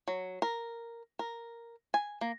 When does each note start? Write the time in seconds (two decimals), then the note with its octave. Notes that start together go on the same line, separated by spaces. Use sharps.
0.08 F#3
0.42 A#4
1.19 A#4
1.94 G#5
2.21 A#3